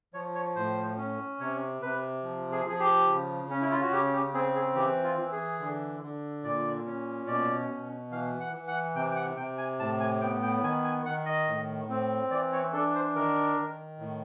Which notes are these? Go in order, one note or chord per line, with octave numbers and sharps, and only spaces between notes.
F3 C#5
C#5
A2 C5
C#4
C3 C#5
C3 B4
F3
G#4
F3 G#4
G4
C#3
C#4
E4
F4
F#4
C#3 G4
G4
C4 G#4
G#4
E3 G4
F4
E3
G#4
D3
D3
A#2 D5
C#4
B2 D5
B2
E3 F5
F#5
E3
F#5
C3 G5
G5
F#5
C3 G5
G#5
A2 A5
G#5
B3 G5
G5
D#3 G#5
G#5
D#3 F#5
D#5
A2
C4
E3 D5
C#5
D4 A4
C5
D#3 A#4
D#3
A2